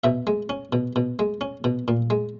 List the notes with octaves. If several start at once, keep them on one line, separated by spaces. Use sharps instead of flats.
B2 E5
G#3
C#4
B2
B2
G#3
C#4
B2
A#2
G#3